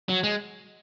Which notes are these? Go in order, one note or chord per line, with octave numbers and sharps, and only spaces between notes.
F#3
G#3